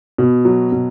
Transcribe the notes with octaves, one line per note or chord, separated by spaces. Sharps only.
B2
F#3
B2